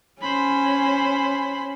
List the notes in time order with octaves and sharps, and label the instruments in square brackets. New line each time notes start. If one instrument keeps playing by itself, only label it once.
[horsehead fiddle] C#4 [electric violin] C5 B5